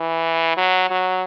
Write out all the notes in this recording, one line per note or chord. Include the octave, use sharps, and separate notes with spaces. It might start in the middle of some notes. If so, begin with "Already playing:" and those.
Already playing: E3
F#3
F#3